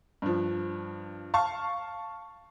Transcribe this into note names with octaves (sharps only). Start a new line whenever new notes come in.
G2 F3
F5 A5 C#6